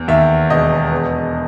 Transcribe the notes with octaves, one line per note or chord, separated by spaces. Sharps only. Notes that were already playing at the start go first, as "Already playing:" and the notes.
Already playing: E2
D#2 E5
E1 D#5
E2